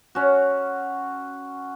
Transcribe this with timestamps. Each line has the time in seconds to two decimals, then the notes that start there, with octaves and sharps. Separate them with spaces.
0.15 C#4 F#4